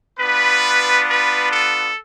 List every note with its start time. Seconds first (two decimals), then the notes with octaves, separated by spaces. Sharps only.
0.19 B3 D4 F4 B4
1.07 B4
1.50 A4